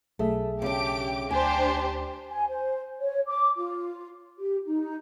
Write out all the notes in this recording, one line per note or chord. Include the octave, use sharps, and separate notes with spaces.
B1 A3 G#4 E5
C#3 D4 G4 D6 D7
D2 D4 G4 C5 G#5
G#5
C5
C#5
D6
F4
G4
D#4